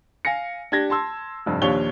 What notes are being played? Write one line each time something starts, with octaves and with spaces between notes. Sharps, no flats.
F5 G#5 A#6 C#7
D4 G4 G#6 A#6
A5 C6 E6
F1 G2
A#1 D#2 D4 G4 C#5 G7